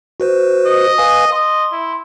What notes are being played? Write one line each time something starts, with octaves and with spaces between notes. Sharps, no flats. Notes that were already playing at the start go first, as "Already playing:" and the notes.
F#4 B4 C5
D#5
B4 F5 G#5
D#5 C6
E4